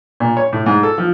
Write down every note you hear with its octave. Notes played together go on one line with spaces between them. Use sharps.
A#2
C#5
A2
G#2
A4
F3